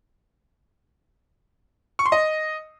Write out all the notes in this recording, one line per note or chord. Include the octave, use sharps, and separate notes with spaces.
C#6
C6
D#5